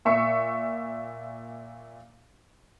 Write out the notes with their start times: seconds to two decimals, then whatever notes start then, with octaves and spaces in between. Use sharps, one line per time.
0.05 A#2 E5 C#6 C#7